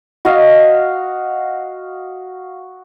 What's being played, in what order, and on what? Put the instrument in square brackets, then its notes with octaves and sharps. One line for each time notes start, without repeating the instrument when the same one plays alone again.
[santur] F#4 D#5 F5